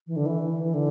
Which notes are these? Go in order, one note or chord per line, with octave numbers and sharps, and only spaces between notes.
E3
D3
E3
E3
D3